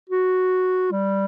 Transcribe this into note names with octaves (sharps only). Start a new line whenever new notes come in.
F#4
G3